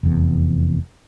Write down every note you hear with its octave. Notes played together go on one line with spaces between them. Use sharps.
F1 E2